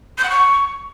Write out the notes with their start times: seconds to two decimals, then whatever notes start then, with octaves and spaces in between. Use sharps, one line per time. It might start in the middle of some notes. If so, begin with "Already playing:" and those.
0.18 G6
0.24 F#5
0.29 C#6